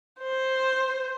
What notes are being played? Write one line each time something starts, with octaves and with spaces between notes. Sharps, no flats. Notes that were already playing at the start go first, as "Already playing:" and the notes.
C5